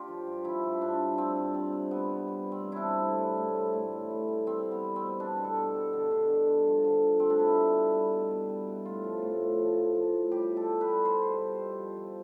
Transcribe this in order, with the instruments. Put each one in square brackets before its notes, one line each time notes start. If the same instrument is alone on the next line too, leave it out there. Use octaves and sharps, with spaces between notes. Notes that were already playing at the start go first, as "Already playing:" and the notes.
Already playing: [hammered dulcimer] D4 F4 G4
F3
G2
F3 E4
G2
G2 D4
G2
F3 C4
G2
G3 C4
C3
C3 B3
G3
G3
C3
C4
E3
D4 E4
C3
A2
G3
A2
G3
A2
E3
A2
G3
G3 C4
G3
B3
G3
C4
B2
G3 D4
B2
A4
B2
G3
D3
D3
G2
G2
F3
D3
D3
D3 C4
D4
B2 E4
B2
G3
G3
B2
B2
G3
B2
A2 F4
F3
A2
A2
F3
F3
F3
A2
G3 G4
B2
A4
G3
B4
G3
G3 C5
B2
G3
B2
F3
F3